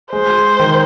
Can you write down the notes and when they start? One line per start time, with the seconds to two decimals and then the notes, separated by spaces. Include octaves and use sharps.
0.12 G#3 C5
0.60 D#3